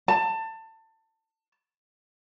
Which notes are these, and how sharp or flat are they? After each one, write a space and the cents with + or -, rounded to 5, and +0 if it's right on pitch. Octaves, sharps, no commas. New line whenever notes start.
A5 +25